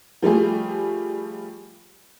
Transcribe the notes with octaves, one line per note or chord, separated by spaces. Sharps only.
F3 G3 A3 G#4